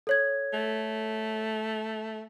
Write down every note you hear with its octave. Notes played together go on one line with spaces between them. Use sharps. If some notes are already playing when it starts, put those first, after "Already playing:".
A4 C#5 G#6
A3